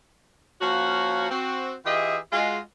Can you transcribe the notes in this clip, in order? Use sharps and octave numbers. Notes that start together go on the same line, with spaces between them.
F3 A#3 C#4 F#4
C4 F#4
E3 F4 G4 G#4 D#5 E5
G#3 F4 F#4